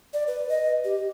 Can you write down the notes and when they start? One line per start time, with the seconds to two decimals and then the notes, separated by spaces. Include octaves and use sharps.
0.13 D5
0.27 B4
0.49 D#5
0.84 G4